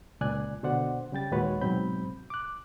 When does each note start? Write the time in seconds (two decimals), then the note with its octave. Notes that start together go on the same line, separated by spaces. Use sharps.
0.21 C#2 A#2 D5 G#5 F#6
0.63 B2 D3 C5 D5 F#5
1.12 C#3 G3 G5 A6
1.31 D#2 A#2 G#3 F#4 B4 C#5
1.61 G#2 B2 F#3 C4 B5 G6
2.30 D6 F#6